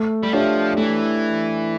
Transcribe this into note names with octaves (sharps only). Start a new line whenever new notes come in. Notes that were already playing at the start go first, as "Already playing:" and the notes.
Already playing: A3
G3
F3 D4 G4 C#5 E5
E3 A3